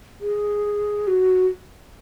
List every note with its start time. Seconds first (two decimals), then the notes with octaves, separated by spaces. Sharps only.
0.21 G#4
1.07 F#4